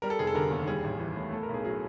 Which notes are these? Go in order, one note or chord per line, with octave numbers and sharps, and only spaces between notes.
G3 A#4
A4
F1 G#4
A4
D3 A#4
D#2
G3 G#4
A1
E3
A2
A3 A4
A#4
B1 G#4
F#3 G#4